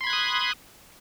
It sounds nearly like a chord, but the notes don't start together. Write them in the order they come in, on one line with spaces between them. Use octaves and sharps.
C6 B5 G#6 F#6 D#6